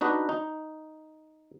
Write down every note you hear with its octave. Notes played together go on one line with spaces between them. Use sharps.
D4 D#4 F#4 B4 D#5
D#4